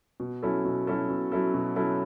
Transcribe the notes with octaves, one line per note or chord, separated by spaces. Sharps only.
B2
F#3 C#4 E4 A4
B2
F#3 C#4 E4 A4
B2
F#3 C#4 E4 A4
B2
F#3 C#4 E4 A4